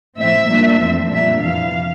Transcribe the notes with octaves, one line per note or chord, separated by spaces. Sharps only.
A2 F3 C4 E5
A#2 G3 A#3 D4
F2 E3 A3 C4
A#2 G3 A#3 D4 E5
F2 C3 E3 F5